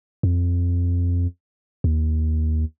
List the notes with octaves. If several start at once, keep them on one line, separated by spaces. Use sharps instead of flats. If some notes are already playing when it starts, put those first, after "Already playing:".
F2
D#2